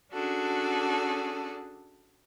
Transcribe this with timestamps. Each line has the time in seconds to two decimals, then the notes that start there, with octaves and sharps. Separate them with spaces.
0.13 C#4 D4 F#4 G#4 A4